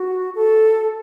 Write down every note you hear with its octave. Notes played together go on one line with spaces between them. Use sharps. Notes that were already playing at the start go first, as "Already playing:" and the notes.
Already playing: F#4
A4